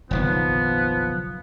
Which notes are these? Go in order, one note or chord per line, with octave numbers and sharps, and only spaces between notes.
F#1 B1 D#3 F3 B3